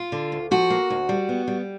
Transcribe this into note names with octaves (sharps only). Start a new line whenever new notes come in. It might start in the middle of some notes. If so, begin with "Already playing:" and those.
Already playing: F4
D3
D2
F3 F#4
A#3
D2
G3
B3
G3